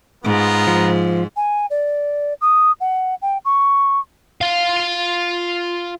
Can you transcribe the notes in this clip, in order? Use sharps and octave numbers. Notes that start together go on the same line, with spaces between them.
G#2 B3 F4 A#5
F3
G#5
D5
D#6
F#5
G5
C#6
F4 F5